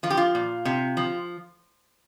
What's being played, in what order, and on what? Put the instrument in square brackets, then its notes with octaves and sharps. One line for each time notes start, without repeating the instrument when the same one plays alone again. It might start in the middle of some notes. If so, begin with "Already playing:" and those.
[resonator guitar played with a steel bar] F3 F4
G4
F4
A#2
C3
F3